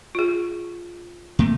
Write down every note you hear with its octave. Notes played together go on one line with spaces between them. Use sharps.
F4 G#4
C3 A3 A#3